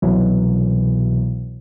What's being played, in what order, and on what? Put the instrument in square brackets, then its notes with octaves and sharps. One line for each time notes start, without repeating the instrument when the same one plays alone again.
[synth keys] C2 B2 E3 F#3